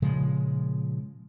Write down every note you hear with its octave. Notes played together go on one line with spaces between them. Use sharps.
A#2 C#3 F3 G#3